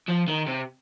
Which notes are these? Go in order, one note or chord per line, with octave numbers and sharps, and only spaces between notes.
F3
D#3
C3